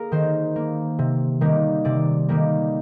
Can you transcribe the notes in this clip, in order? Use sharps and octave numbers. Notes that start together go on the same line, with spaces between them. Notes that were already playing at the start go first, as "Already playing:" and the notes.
Already playing: A#3 G#4 A#4
D#3 C5
A#3
C3
D#3 G3 A#3
C3 D5
D#3 G3 A#3